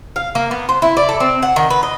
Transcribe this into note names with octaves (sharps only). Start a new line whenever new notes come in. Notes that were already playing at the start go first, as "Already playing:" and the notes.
F5
A#3
B3
C5
E4
D5
A4
C4
F#5
D#3
B4
D#5